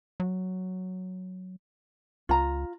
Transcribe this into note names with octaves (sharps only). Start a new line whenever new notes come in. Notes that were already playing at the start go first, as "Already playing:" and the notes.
F#3
C#2 F4 A#5